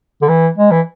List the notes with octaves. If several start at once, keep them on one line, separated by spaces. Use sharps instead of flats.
D3
E3
G#3
E3